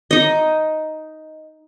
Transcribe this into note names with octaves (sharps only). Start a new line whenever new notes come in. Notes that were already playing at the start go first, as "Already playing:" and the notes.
D#4 D#5